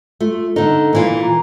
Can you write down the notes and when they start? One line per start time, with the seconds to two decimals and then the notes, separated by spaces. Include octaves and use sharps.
0.20 A3 F4
0.56 D3 D#4 A4
0.93 A#2 E3 F4
1.22 A#5